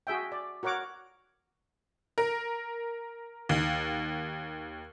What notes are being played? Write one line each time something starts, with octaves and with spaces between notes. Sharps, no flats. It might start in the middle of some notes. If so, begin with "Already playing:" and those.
F#4 G#4 E5 G5
D5
F#4 A#4 C#5 F#5 D6
A#4
D#2